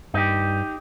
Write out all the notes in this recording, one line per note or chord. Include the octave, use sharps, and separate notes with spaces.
G2 D#4 G4